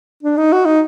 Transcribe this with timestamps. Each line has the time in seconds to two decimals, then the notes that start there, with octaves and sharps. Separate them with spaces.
0.23 D4
0.37 D#4
0.52 F#4
0.66 D#4